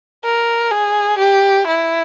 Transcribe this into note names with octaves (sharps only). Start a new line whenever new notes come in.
A#4
G#4
G4
E4